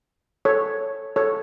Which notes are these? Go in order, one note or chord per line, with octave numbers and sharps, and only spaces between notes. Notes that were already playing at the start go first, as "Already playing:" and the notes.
A4 C#5
A4 C#5